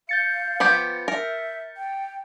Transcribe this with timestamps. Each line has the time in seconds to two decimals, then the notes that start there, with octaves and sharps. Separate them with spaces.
0.09 F5 G6 A6 C#7
0.60 F3 B3 G4
1.08 A#4 E5
1.77 G5